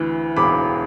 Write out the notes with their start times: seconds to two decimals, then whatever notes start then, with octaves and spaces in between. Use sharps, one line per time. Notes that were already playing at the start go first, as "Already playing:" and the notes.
Already playing: D2 E3
0.36 E1 B5 D6